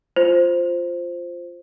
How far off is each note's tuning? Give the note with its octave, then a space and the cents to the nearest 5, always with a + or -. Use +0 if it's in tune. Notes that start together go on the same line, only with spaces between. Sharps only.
F4 +0 C5 +0